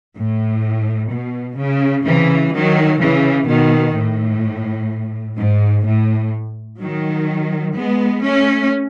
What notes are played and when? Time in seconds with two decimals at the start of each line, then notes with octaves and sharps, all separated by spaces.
0.17 A2
1.11 B2
1.58 C#3
2.05 C#3 E3
2.54 D#3 F#3
3.01 C#3 E3
3.48 B2 D#3
3.96 A2
5.38 G#2
5.86 A2
6.81 D#3 F#3
7.76 G#3 B3
8.24 A3 C#4